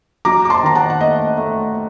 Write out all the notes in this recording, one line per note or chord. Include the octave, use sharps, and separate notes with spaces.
F#3 A#5 D6
D6
A5 C6
D#3 A#5
F#5 A5
F#5
A3 D#5
A3